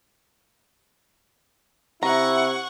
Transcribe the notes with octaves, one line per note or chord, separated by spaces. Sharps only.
C3 E4 F#5 A#5 C#6